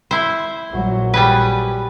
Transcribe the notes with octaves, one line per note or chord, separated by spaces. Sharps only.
E4 C5
A#1 F#3
G3 G#4 B4